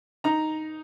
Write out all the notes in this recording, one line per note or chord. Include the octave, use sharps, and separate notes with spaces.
D#4 A#5